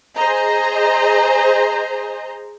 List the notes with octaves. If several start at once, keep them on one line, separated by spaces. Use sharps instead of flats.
G#4 C5 D#5 A#5